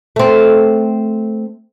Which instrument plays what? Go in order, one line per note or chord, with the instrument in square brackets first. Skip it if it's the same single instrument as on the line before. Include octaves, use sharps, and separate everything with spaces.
[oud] A3 C4